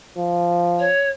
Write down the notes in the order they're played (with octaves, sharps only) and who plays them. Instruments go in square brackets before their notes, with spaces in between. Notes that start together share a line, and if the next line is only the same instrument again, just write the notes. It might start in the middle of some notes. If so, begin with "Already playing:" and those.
[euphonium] F3
[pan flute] C#5